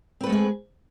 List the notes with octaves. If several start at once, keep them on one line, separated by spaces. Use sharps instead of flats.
G#3 A3 C4 G#4 B4